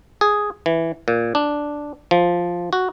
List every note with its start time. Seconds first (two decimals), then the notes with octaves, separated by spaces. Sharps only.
0.21 G#4
0.66 E3
1.08 A#2
1.35 D4
2.11 F3
2.73 F#4